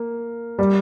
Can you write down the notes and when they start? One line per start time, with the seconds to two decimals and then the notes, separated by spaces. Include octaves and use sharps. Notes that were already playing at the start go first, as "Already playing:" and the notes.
Already playing: A#3
0.59 G3